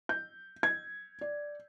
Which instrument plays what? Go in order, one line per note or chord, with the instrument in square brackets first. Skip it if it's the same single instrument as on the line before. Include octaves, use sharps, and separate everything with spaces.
[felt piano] G6
G#6
D5